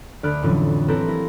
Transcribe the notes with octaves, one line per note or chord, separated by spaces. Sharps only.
D2 D5 B5 F6 F#6
F2 A2 D3 E3 F#3 C#4
C4 E4 G4 A4 B4 A#5
A#3 E4 A#6